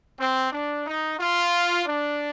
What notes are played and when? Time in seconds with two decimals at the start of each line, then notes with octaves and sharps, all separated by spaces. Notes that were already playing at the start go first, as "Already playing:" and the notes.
0.19 C4
0.52 D4
0.86 D#4
1.19 F4
1.86 D4